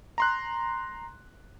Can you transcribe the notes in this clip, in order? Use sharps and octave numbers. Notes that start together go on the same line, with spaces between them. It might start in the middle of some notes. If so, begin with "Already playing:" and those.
A#5 C6 F#6